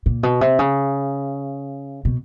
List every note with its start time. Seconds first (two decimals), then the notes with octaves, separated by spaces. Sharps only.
0.06 A#2
0.23 B2
0.41 C3
0.59 C#3
2.05 B2